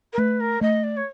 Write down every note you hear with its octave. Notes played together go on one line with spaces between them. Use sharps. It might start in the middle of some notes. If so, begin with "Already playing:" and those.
A#4
A3 B4
A#4
A3 D#5
D5
C#5